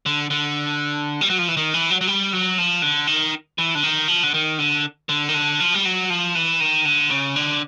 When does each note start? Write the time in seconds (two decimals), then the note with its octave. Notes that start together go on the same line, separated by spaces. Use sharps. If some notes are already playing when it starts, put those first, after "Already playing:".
0.06 D3
0.30 D3
1.21 G3
1.30 F#3
1.38 F3
1.48 E3
1.57 D#3
1.74 E3
1.90 F#3
2.01 F#3
2.07 G3
2.33 F#3
2.58 F3
2.82 D3
3.07 D#3
3.58 E3
3.75 D3
3.83 D#3
4.08 F3
4.23 D3
4.34 D#3
4.59 D3
5.09 D3
5.29 D#3
5.34 D3
5.60 F3
5.74 G3
5.85 F#3
6.10 F3
6.35 E3
6.60 D#3
6.85 D3
7.10 C#3
7.36 D3